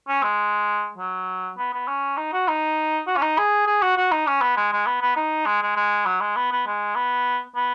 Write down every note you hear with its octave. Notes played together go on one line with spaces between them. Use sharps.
C#4
G#3
F#3
B3
B3
C#4
D#4
F#4
D#4
F#4
C#4
D#4
G#4
G#4
F#4
F#4
D#4
C#4
B3
G#3
G#3
B3
B3
D#4
G#3
G#3
G#3
F#3
G#3
B3
B3
G#3
B3
B3